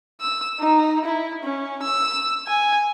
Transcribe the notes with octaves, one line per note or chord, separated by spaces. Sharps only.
E6
D#4
E4
C#4
E6
G#5